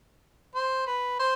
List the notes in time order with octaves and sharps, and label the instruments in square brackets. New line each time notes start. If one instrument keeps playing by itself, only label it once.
[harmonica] C5
B4
C5